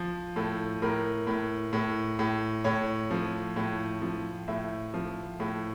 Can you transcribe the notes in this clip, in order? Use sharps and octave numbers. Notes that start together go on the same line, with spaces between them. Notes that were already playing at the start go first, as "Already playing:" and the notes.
Already playing: F3
A2 A4
A2 A#4
A2
A2
A2
A2 C#5
F3
A2
F3
A2 E5
F3
A2